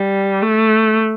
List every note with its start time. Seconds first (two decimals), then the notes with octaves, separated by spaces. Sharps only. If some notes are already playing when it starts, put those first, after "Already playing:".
Already playing: G3
0.42 A3